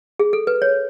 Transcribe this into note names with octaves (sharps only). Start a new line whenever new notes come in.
G#4
A4
B4
C#5